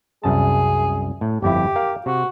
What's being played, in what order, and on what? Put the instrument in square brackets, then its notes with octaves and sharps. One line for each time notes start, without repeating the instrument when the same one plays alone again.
[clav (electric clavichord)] C2 F#2 A5 [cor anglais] G#4
[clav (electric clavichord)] A2
[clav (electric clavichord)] G1 F2 E4 [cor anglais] G4
[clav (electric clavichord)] A#4 F5
[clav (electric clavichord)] C3 [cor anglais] F#4